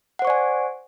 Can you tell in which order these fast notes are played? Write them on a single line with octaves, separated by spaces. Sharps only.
F#5 C5 C#6 D5 G#5